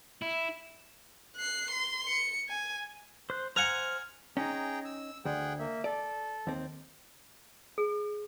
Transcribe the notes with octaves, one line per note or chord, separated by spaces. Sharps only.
E4
F#6 C7
C6
C#7
G#5
C5 F#6
C5 F#5 G#5 A#5 F6 F#6
C#4 D#4 G#4 G5 A#5
E6
D2 G#4 F#5 G5
A#3 E5
A4 D5
D#2 C4
G#4